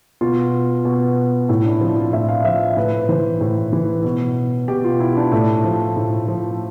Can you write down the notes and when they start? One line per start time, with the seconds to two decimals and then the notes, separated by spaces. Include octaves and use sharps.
0.21 B2 F4
0.85 B2
1.49 A2 E4
1.65 D4
1.81 F3 C4
1.97 F4
2.13 A2 E5
2.29 F5
2.45 F3 E5
2.77 A2 B4
3.09 E3 C5
3.41 A2
3.73 E3
4.04 B2
4.68 B2 G4
4.84 F4
5.00 E4
5.17 D4
5.32 A2 A3
5.64 F3
5.96 A2
6.28 F3